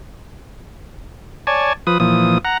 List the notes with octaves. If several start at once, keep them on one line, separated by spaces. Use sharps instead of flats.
C#5 D5 G#5 A5
F3 B4 D#6
A#2 E3 F3 D#6
F#5 A#5